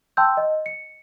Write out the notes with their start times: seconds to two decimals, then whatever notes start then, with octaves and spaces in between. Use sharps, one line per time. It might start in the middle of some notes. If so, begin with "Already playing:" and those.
0.17 G5 A5 C6 E6 G6
0.37 D#5
0.66 C#7